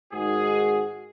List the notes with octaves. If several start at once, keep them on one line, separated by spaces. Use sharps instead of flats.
G#2 D#3 F#4 G#4